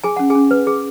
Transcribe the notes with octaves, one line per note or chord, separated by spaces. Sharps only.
G#4 G#5
C#4 F#5
G#4 G#5
C#4
B4
G#4